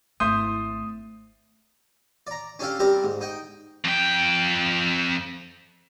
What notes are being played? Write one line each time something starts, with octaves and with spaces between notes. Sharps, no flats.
G#1 A3 E4 C5 E5 C6 D#6 G6
D5 A#5
C#4 D4 G4 A4 F5
G3 C4 G4 A#4 D5
G#2
D#4 G5
F2 G5